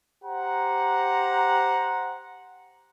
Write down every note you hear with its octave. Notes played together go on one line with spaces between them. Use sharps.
G4 C5 F#5 A#5